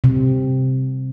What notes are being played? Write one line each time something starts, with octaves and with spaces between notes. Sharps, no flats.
C3